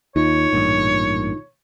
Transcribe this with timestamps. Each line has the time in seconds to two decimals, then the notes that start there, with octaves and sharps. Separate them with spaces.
0.16 D#2 D#4 F4 C#5
0.53 A1 G2 A#2